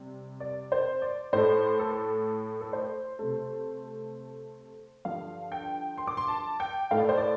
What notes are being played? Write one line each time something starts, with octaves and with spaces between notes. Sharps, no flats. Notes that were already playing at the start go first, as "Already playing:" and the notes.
Already playing: C3 G3
D5
C5
D5
A2 A3 C5
A4
A4
C5
C3 A3
G2 D3 F3 F5
G5
C6
D6
C6
A5
G5
A2 A3 F5
D5
C5
D5